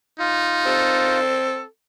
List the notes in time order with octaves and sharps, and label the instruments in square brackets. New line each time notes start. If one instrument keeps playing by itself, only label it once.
[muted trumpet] D#4 [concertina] F4
[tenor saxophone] C4 [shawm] A4